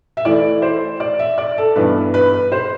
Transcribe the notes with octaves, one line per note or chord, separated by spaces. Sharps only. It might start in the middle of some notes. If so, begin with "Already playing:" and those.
E5
E3 A3 E4 D5
C5
D5
E5
D5
A4
G2 E3 B3 B4
B4
B4
C5